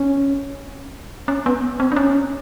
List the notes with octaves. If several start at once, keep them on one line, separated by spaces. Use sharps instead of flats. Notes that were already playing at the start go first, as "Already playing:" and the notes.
Already playing: C#4
C#4
B3
C4
D4
C#4